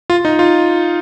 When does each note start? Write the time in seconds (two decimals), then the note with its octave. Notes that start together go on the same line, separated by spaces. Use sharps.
0.10 F4
0.25 D#4
0.39 F4